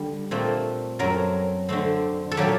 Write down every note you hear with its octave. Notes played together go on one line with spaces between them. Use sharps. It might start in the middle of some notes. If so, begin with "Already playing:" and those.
Already playing: D3 G3
A#2 A3 C4
F#2 F#3 A3 C4 A#4
D3 A3 C4
A4
A#2 F#3 A3 G4